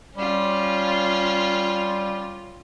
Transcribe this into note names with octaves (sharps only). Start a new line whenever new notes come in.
G3 C#4 F4